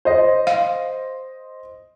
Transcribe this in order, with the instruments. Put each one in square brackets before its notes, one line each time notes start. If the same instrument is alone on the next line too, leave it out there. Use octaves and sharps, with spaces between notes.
[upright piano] C5 D#5
[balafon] F5